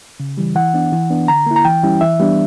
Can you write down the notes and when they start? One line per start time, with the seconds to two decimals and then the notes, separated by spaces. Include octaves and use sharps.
0.20 C#3
0.38 E3 G3
0.55 E3 F#5
0.74 B3 D4
0.92 E3
1.10 B3 D4
1.28 D3 A#5
1.46 A#3 E4
1.56 A#5
1.65 E3 G5
1.83 G3 C#4 E4
2.01 E3 E5
2.20 G3 B3 D4